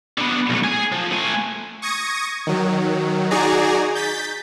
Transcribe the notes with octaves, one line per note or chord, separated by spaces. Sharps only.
D3 B3
B1 A3
G#4 G#5
F3
A3 G#5
C#6 D#6 G#6 A#6 C#7
D#3 F#3
D#4 F#4 G#4 D5 G#5 A#5
G6 A6 B6